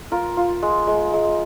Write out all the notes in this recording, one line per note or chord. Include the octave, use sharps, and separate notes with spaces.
F4 A#4
F4
G#3
G#3
G#3